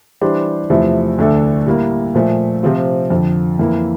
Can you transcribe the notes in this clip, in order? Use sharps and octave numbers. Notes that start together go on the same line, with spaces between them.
E3 G3 D4 G4 C5
E2 C3 F3 A3 E4
D2 D3 A3 D4 A4
A2 G3 A#3
A#2 F3 A3
C3 F3 C4 F4
F2 D3 F3
F2 E3 A#3